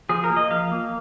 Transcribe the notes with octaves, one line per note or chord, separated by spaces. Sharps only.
F3 G#4
A#4
A#3
D#5
F3 F5
A#3